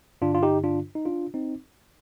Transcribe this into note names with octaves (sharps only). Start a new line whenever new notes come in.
G2 D3 D4 F4
F4
D#4 G4
D4 F4
D#4
D4 F4
C4 D#4